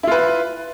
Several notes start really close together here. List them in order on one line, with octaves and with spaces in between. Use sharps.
E4 F4 B4